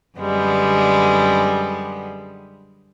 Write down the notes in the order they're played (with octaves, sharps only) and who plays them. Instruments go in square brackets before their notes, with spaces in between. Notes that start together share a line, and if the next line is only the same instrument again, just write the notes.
[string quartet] F#2 D3 G3 G#3 B3